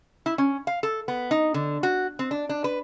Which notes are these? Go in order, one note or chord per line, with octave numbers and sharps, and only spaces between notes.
E4
C#4
F5
A4
B3
D#4
D3
F#4
C4
D4
D4
B4